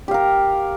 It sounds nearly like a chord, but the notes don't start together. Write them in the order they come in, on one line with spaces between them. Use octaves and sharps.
G4 F5 A#4